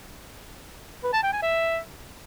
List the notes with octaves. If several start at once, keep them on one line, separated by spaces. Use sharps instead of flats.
B4
A5
G5
G#5
E5